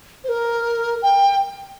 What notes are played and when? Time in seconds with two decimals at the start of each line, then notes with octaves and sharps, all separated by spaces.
0.24 C5
0.29 A#4
1.02 G5